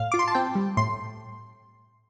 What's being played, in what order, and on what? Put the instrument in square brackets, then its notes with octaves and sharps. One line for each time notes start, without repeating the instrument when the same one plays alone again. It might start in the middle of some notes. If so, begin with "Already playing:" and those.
Already playing: [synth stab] A2 F5
F4 D6
C6
A5
C4 G5
G3
A2 C6